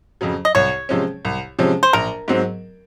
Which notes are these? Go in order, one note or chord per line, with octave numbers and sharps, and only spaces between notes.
F2 C#3 F#3
D#5
C2 C#5
C3 F3 G#3 C#4
C2
C3 F3 G#3 C#4
C5
A#1 A#4
G#2 F#3 C4